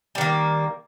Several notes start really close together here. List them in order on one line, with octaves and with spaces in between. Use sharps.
G3 D#3 A#3